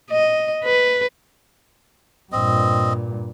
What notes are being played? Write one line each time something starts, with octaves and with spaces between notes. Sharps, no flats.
D#5
B4
G2 A#2 C4 D#5